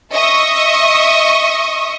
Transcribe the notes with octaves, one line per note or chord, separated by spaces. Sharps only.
D#5 E5 C#6 D#6